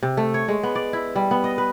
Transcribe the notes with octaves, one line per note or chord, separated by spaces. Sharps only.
C3
A3
C#5
G#3
B3
D5
E4
G3
B3
D#5
B4